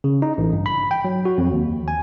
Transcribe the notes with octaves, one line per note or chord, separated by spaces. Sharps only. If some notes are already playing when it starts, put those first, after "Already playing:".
C#3
D#4
A1
G2
B5
G5
F#3
F#4
F2
D#2
G#5